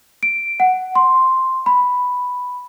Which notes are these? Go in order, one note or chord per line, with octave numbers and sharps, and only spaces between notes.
D7
F#5
C6
B5